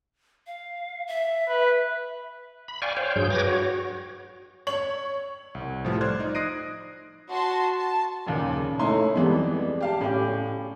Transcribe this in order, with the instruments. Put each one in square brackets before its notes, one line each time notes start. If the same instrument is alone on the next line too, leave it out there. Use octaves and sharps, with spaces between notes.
[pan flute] F5
E5
[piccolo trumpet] B4
[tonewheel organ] B5
D5 F5 G5 G#5 C#6
C5 C#5 F5 G5
G2 F#3 G#4 G6
B4 C#5 G5 D6 G#6 A#6
F#4 C#5
[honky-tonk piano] C#5 F#7
[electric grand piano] C2
A2 F3 G3
C5 D5 F6 F#6 G#6
D#4
D#6 F#6 A#6 C7 D7 D#7
[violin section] F#4 A5 C6
A5
[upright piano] D#2 A#2 C#3
C#3
[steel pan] A3 D#4 [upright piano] C#4 E4 C6
[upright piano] F2 E3 G#3 [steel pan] G3 B3
[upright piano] G4 F5 A5
[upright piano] A2 [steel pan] C#4 G4